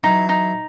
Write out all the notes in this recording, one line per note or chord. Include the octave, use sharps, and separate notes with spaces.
E3 F#3 D#4
D#4